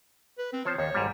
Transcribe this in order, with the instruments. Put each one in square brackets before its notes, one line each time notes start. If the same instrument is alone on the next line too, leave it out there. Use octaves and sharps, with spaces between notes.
[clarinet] B4
C4
[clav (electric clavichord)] F3 C5 A5 [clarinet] C#5
[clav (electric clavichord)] D#2 [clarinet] C#5
[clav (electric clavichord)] G#1 G#2 G3